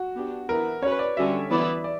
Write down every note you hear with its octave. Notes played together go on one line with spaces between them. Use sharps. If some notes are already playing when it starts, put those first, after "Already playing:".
Already playing: F#4
B3 D4 G4
E3 B3 E4 A#4 B4
C#4 F#4 B4 C#5
D5
D3 G3 C#4 F#4 E5
E3 B3 E4 B4 D5
D5